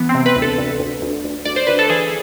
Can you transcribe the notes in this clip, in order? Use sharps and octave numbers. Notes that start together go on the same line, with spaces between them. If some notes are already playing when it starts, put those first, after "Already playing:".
Already playing: E3 B3
C4
C3
B4
D2
A4
D2
D2
D2
D2
D2 D5
C5
D2 B4
A4
E3 G#4